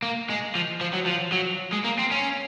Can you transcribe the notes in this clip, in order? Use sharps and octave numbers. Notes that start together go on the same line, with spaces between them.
A#3
G#3
F3
F3
F#3
F3
F#3
G#3
A#3
C4
C#4